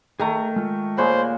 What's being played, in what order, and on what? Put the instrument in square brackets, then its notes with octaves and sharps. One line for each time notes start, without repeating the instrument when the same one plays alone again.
[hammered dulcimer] D#3 A3 [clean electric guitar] G#4 A#5
[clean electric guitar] G#3 F4
[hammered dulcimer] A#2 G#3 C#5 [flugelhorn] C5 [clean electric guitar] B5